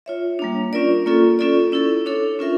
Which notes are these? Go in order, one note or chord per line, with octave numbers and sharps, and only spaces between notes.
F4 C#5 E5
G3 A#3 D4
C#4 F4 A#4 D5
A#3 C#4 F4 A4
C#4 F4 A4 D5
C#4 E4 A4
D4 A4 C#5
C#4 F4 A#4 E5